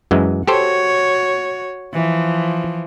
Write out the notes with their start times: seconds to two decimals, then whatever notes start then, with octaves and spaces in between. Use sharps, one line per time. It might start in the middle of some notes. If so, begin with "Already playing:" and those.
0.11 F#2 E3 G#3
0.47 F#4 G4 A4 C5 C#5
1.93 E3 F3